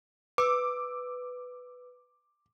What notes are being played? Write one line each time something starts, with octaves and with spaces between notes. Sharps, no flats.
B4 D6 E6